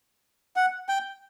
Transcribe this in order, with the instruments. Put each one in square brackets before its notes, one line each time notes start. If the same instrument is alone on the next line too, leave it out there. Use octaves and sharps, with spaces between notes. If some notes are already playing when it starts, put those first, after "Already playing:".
[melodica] F#5
G5